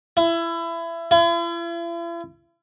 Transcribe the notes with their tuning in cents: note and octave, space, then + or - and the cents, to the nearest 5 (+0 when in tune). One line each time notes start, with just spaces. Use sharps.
E4 +25
E4 +45